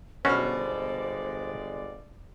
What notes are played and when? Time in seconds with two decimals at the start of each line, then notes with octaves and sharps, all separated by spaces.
0.25 G1 B2 G#3 C#4 F#4 C5 D5 F6